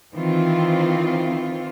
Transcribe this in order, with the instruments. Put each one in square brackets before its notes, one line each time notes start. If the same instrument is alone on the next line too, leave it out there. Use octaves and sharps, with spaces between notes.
[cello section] D#3 E3 C4 F4